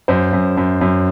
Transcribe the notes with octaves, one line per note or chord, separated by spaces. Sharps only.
F#2 C5
F#2
F#2
F#2